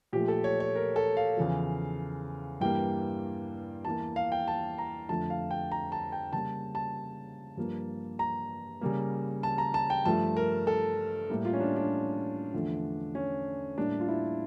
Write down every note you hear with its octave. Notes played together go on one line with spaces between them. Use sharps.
A#2 F3 A3 G4
A4
C#5
C#5
A#4
A4
F5
E2 C#3 F3
G2 E3 G3 A#3 G5
E2 E3 A#3 A5
F5
G5
A5
A#5
F2 D3 F3 A3 A5
F5
G5
A#5
A5
G5
C#3 G3 A#3 A5
A5
G2 F3 A#3
A#5
C#3 G3 A#3
A5
A#5
A5
G5
G2 F3 A3 A5
A#4
A4
A2 G3 A#3
F4
C#4
D4
D4
E2 D3 F3 A3
C#4
A2 G3 A#3 D4
F4
E4